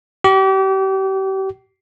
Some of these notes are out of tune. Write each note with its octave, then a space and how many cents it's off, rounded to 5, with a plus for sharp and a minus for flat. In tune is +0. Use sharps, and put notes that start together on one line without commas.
G4 -35